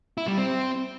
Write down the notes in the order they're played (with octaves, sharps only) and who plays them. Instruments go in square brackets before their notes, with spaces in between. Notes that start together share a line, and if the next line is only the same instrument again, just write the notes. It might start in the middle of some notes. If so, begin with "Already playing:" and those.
[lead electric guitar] E4
G3
C4